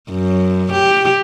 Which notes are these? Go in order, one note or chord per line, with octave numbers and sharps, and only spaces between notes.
F#2
G4